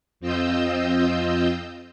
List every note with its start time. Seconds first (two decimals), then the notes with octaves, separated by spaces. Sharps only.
0.20 F2 C4 F4 D#5 E6 G6